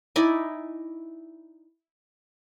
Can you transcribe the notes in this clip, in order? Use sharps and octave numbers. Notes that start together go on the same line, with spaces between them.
D#4 E4 D5 G#5